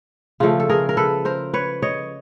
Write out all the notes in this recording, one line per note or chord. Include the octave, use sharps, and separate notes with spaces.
C#3 F3 A3 F4
A4
G#4 A#4
A#4
A4 B4
A#4 C5
B4 C#5
C#5 D#5